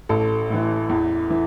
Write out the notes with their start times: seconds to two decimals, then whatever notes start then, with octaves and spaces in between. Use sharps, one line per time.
0.09 A1 A4
0.50 A2 E3
0.89 E2
1.30 E3